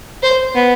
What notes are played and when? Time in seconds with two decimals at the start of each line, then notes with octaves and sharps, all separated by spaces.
0.23 C5
0.55 B3